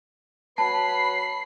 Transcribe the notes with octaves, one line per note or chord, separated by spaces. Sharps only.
F#3 B4 A5 B5 C7